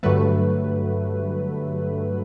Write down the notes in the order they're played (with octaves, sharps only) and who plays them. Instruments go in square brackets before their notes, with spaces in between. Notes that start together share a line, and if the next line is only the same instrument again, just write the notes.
[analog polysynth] G2 D3 F#3 A3 B4